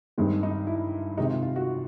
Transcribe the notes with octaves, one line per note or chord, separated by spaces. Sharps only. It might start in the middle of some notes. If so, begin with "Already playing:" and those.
G2 D#3 G#3 C4
D#4
E4
C3 D#3 G#3 C4 D#4
F4
F4
F#4